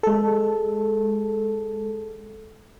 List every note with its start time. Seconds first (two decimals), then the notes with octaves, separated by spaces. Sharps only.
0.03 G#3 A4